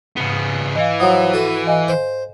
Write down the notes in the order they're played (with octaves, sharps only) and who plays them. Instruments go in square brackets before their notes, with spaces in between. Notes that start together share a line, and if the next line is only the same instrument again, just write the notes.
[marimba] G#2 [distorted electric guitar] C#3 B3
[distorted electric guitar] E3 [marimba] D#5 F5
[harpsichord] F3 F#3 [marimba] F#5 D#6
[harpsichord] F#4 [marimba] A4
[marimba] D#5 F5 G#5
[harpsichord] C5